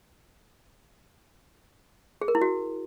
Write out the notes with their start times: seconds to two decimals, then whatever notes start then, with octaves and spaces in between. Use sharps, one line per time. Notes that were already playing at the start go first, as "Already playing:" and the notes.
2.21 G#4
2.28 A#4
2.35 E4
2.42 F#4